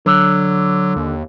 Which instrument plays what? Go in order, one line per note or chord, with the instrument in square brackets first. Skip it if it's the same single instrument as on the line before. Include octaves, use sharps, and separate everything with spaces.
[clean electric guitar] D3 [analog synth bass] F#3
[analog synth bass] D#2